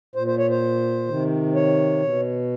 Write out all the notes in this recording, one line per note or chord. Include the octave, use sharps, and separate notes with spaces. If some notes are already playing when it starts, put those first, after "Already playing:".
A#2 C5
C5
C#5
C5
C3 D#3
C#5
B2